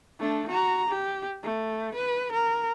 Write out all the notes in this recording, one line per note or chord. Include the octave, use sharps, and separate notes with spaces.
A3 D4
F#4 A#5
G4
A3
B4
A#4